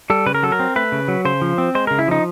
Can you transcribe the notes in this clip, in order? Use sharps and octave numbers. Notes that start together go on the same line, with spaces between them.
G3 A4
C#3 B4
A#4
F#3 A4
A#4
C4
A3 B4
C#3
F#3
C#3 C5
F3
C4
G#3 C5
C#3 A#4
E4
F3 D#4